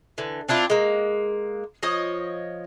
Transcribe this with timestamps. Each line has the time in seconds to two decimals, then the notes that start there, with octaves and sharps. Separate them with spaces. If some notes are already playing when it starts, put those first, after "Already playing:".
0.18 D3 E3
0.48 C4 D4 E4 F4
0.70 G#3 A#3
1.83 F3 C#5 D#5